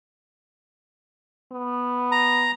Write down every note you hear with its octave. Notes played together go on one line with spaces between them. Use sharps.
B3
A#5